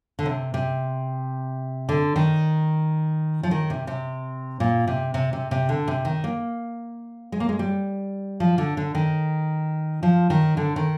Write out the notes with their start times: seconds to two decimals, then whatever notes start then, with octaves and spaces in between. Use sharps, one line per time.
0.19 D3
0.26 C3
0.54 C3
1.89 D3
2.16 D#3
3.43 F3
3.51 D#3
3.70 C3
3.87 C3
4.60 A#2
4.87 C3
5.14 C3
5.33 C3
5.51 C3
5.69 D3
5.88 C3
6.05 D#3
6.24 A#3
7.32 G#3
7.40 A#3
7.49 G#3
7.59 G3
8.40 F3
8.58 D3
8.77 D3
8.95 D#3
10.03 F3
10.30 D#3
10.57 D3
10.76 D#3